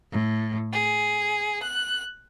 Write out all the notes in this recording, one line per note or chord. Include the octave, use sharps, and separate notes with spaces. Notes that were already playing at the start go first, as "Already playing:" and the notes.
A2
G#4
F#6